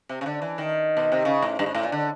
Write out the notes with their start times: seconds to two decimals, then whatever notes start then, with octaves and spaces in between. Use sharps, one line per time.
0.09 C3
0.21 C#3
0.26 D3
0.42 E3
0.58 D#3
0.97 B2
1.12 C3
1.25 C#3
1.42 A2
1.59 G2
1.66 G#2
1.75 A2
1.83 A#2
1.92 D3